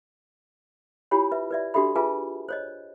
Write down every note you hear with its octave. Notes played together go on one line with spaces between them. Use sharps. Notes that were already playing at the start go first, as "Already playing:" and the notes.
E4 F4 G4 C#5 G#5 B5
B4 E5
B4 D5 E5
D4 F#4 G4 A4 E5 B5
F4 G#4 B4 E5 G#5 A5
C5 C#5 D#5